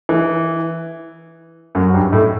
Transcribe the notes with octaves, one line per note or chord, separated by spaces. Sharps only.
E3
F#2 F#3
F#3
G2 G3
A2 A3